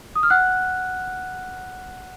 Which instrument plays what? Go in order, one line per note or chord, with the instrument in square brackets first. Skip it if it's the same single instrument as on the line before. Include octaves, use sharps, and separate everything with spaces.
[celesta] D#6
F6
F#5 F#6